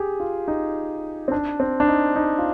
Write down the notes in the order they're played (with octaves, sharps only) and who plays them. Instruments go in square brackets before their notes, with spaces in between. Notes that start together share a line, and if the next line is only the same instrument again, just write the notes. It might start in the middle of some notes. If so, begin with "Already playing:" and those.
Already playing: [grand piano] G4 G#4
F4
D#4
C4
D4
C4
D4
D#4
D#4
F4